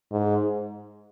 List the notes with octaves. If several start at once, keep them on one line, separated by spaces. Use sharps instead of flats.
G#2